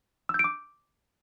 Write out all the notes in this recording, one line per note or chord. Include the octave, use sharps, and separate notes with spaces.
E6
G6
D7
D6